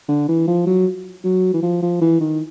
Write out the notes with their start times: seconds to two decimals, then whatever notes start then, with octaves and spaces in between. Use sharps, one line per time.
0.09 D3
0.28 E3
0.48 F3
0.67 F#3
1.24 F#3
1.54 E3
1.63 F3
1.82 F3
2.01 E3
2.21 D#3